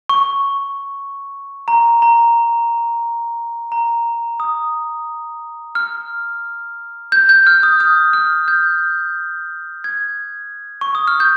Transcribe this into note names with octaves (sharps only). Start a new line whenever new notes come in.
C#6
A#5
A#5
A#5
D#6
F6
G6
G6
F6
D#6
D#6
F6
G6
G#6
C#6
D#6
F6
G6